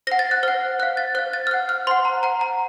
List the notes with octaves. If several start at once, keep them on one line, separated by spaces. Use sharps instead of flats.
C5 F#5 A#6
A6
F#6
C5 F#5 F6
C5 F5 F#6
A6
C5 F5 F#6
A6
F6
C5 F#5 F#6
F6
C5 F#5 C6
A#5
C5 F#5 A#5
A#5